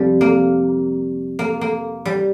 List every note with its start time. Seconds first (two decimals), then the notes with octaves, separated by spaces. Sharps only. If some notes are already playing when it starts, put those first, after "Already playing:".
Already playing: F2 C3 F3 G3
0.21 A#3
1.39 A#3
1.61 A#3
2.05 G3